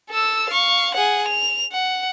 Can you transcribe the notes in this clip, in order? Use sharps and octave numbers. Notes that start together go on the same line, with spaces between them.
A4 E6
F5 C#6
G#4 F#5
F7
F#5